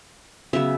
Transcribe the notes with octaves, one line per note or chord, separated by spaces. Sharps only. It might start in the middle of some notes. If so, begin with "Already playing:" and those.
C#3 F#3 B3 E5